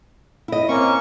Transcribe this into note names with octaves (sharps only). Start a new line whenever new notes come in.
E4 D#5
A#3 C4 C#4 C#6